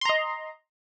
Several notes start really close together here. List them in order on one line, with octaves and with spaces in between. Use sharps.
C6 A#5 D#5